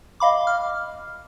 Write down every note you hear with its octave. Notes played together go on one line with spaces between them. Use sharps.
D#5 F5 B5 D6
F6